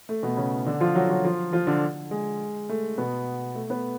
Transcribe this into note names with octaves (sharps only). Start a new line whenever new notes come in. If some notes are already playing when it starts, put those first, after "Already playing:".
A3
B2 B3
C#3 C#4
D3 D4
F3 F4
F#3 F#4
F#3 F#4
F3 F4
F3 F4
D3 D4
G#3
A3
B2 B3
A3 A4
B3 B4